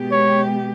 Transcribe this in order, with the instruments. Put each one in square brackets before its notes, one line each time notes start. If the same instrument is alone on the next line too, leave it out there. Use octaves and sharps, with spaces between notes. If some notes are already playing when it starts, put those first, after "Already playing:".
Already playing: [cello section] B2 G#3 B3 G4
[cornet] C#5